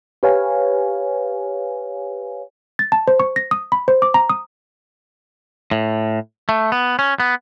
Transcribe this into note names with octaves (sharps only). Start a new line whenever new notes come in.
G4 B4 C#5 F5 G#5
A6
A5
C5
C#6
A#6
D#6
B5
C5
D6
A#5
D#6
A2
A3
B3
C#4
B3